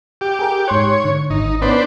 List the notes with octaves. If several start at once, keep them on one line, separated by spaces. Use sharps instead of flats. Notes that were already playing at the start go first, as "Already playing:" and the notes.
G4
G#4 A#4 G5
G#2 C#5 C6 F#6
D3
G#1 D#4
B3 C#4 D4 B4 C5